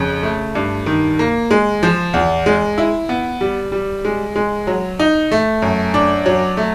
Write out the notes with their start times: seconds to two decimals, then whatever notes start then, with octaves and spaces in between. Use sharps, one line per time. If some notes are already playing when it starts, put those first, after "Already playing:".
Already playing: F2 C#3
0.23 A3
0.55 G2
0.86 D#3
1.19 A#3
1.51 G#3
1.83 F3
2.14 E2
2.46 G#3
2.78 E4
3.09 B3
3.41 G3
3.72 G3
4.05 G#3
4.36 G#3
4.67 F#3
4.99 D#4
5.32 A3
5.62 F#2
5.94 D4
6.26 F#3
6.57 A3